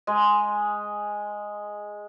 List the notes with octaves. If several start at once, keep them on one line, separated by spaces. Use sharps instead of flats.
G#3 G#5